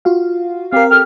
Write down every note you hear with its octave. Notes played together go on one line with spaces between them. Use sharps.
F4 F#4 F5
C4 G4 A#4 F5
G4 A4 F6